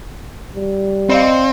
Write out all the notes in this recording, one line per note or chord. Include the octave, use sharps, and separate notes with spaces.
G3
C4 D5 D#5 F5